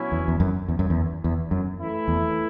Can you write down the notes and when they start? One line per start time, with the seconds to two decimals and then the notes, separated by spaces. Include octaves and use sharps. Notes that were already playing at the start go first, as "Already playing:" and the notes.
Already playing: B2 F#3 C#4 E4
0.12 E2
0.28 E2
0.40 F#2
0.68 E2
0.79 F#2
0.90 E2
1.24 E2
1.51 F#2
1.80 E3 A3 E4
2.08 E2